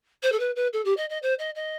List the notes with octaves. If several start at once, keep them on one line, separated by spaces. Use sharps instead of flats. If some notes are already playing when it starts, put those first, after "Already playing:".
C5
A4
B4
B4
A4
G4
D#5
D#5
C5
D#5
D#5